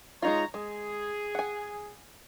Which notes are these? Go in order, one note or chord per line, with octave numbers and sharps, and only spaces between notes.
G#3 D#4 F4 C#5 A#5
G#3 G#4
F#5 G#5